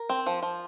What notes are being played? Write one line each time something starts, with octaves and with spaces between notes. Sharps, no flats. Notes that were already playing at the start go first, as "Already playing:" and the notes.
Already playing: A#4
C4
F3
F3